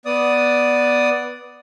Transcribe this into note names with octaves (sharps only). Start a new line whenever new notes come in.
B3 D5 D#6